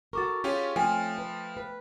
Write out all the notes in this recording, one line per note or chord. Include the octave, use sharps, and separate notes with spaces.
F#4 A4 A#4 C#6 D6 A6
C#4 F4 G4 G#4
F3 A3 C4 C#4 G5 G#5 F6
B4
B4